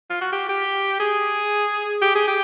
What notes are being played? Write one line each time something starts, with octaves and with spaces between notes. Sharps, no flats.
F4
F#4
G4
G4
G#4
G4
G#4
G4